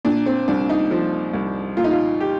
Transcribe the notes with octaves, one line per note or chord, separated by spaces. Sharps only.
A#2 D4
C4
C2 D4
D#4
F3
C2
A#2 F4
D#4
F4
G4